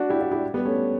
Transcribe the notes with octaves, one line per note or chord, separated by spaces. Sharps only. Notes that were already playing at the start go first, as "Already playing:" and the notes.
Already playing: D4 F#4
E4 G4
D4 F#4
E4 G4
G3 B3
A3 C#4